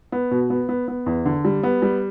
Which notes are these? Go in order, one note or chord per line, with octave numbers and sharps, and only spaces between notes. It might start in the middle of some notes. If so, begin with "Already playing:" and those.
B3
B2
B3
B3
B3
E2
D3
G3
B3
G3